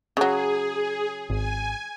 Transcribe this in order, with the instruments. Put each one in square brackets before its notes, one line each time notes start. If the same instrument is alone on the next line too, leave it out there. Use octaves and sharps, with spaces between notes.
[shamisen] C#3 F#3 [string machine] G#4
[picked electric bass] G#1 [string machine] G#5